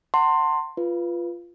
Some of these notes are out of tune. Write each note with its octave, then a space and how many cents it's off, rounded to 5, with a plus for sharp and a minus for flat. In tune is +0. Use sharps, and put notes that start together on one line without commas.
F#5 +0 A5 +40 C6 +10
F4 -10 B4 +0